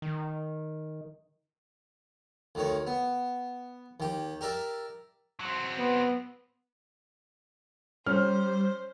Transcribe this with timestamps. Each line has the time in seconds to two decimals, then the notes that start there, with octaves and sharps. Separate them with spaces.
0.02 D#3
2.55 D2 D#3 C#5
2.87 B3
4.00 D#2 G4
4.41 G4 A#4 D5 E5
5.40 F#3 C4
5.78 B3
8.06 G3 C#4 C5 F6